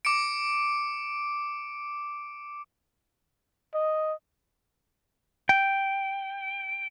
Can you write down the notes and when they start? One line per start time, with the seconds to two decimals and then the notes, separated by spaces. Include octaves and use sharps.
0.05 D6 C#7 D7
3.74 D#5
5.49 G5